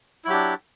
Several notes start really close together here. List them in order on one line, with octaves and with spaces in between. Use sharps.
E4 F#3 G4 D4